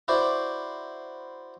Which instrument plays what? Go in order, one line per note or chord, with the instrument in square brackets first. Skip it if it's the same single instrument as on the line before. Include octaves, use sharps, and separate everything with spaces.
[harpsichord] E4 F#4 C5 D5